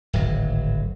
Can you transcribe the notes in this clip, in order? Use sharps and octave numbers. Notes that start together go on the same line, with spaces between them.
D1 G#1 F#3